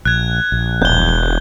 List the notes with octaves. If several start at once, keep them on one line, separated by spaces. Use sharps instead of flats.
A#1 F#6 G#6
A#1
E1 G6 G7